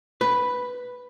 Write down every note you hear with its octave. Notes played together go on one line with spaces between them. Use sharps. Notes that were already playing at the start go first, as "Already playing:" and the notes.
B4